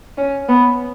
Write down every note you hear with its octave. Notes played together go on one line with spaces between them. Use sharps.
C#4
B3